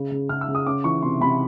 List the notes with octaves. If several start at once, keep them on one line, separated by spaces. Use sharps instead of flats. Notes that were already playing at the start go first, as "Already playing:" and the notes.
Already playing: C#3
C#3
C#3 F6
E6
C#3
D#6
C#4 D6
E3 C#6
C3 C6
C3 B5